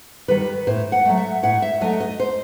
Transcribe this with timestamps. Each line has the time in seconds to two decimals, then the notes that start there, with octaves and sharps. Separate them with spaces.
0.28 D#3 G3 B4
0.67 A2 C5
0.92 F#5
1.05 F#3 A3
1.17 E5
1.43 A2 F#5
1.62 E5
1.81 F#3 A3 D#5
2.00 D#5
2.20 C5